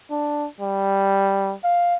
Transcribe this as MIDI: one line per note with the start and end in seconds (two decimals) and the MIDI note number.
0.11 0.47 62
0.61 1.54 55
1.64 1.96 77